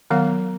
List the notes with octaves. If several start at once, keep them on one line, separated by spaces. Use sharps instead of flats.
D#3 F#3 B3 F5